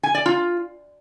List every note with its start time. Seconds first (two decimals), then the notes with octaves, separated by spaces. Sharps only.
0.03 G#5
0.15 D5
0.26 F4